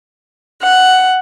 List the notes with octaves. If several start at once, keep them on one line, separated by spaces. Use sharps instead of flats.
F#5